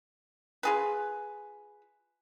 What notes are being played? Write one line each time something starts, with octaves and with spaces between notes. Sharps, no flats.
F4 G#4 B4